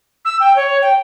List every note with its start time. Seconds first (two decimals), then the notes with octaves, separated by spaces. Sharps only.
0.25 E6
0.40 G5
0.56 C#5
0.82 G5